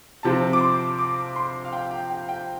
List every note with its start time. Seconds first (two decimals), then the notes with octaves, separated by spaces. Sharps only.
0.23 C3 F3 C4 A5
0.53 D6
0.61 C6
0.99 D6
1.36 C6
1.65 F5
1.73 G5
1.91 G5
2.10 G5
2.29 G5